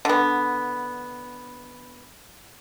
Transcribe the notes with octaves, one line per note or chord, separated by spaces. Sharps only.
D3 B3